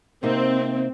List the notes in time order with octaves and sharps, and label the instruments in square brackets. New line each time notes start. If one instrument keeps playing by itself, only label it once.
[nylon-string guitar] C3 A#3 D#4 [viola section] C4